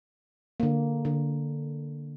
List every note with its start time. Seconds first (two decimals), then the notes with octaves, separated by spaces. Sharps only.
0.60 D3 A#3
1.05 D3